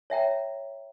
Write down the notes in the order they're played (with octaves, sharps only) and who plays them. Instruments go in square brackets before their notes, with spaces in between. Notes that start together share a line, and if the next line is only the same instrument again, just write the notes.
[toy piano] C#5 E5 G5 A#5